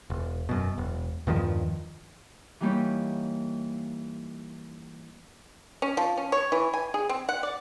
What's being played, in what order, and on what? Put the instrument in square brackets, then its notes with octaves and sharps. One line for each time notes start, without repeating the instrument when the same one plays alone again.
[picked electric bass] E1
F#2 B2
E1
E2 G2 D#3 F3
[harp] E3 G3 A#3 D#4 G4 C#5
[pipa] C#4
F3
C#4
C#5
E3
G#5
G#4
C4
F#5
D5